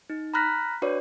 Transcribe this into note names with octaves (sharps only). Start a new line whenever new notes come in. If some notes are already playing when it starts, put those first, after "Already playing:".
D#4
A#5 B5 F6 F#6 A#6 B6
D4 F#4 B4 C#5 D5